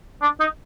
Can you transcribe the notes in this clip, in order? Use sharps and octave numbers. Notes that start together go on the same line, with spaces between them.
D4
D#4